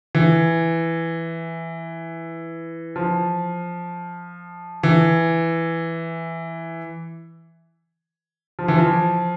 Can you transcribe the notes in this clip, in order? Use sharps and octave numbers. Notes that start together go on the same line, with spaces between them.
E3
F3
E3
F3
E3
F3